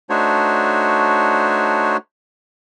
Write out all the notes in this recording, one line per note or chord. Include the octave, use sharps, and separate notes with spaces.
A3 D4 D#4 F#4 C5 C#5